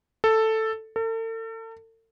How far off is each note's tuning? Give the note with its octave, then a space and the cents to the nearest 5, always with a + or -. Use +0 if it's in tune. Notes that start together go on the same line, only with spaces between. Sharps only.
A4 +5
A4 +40